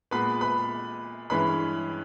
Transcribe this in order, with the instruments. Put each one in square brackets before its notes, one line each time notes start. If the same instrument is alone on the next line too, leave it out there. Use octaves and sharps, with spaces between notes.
[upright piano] A#2 G#3 B3 B4 B5
B4 B5
G2 E3 G#3 C#4 B4 B5